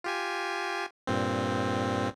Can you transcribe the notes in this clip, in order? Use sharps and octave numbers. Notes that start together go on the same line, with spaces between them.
F4 G4 G#5
G2 A#2 C4